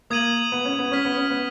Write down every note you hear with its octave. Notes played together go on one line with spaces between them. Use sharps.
A#3 D#6 G#6 D#7 F#7
B3
C#4
B3
C#4 F6 B6 F7
B3
C#4
B3